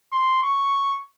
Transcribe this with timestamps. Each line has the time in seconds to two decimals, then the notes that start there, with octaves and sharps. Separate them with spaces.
0.12 C6
0.43 C#6